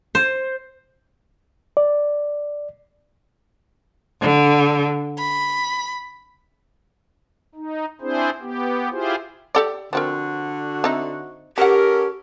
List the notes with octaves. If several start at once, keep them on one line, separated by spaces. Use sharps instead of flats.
C5
D5
D3
B5
D#4
C4 D4 E4 G#4 C5
B3 G4
E4 F4 G4 G#4 C5
G4 A4 D5
D3 F3 C4 F#4 A#4
C4 D#4 E5
C#4 F#4 G4 A4 A#4 F#5